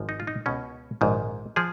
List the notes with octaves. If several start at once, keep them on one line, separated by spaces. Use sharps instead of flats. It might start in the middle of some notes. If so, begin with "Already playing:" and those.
Already playing: G#1 G#2 F3
D#4
F4
D#4
C#2 B2 C#4
A#1 G#2 D#3
F3 G#4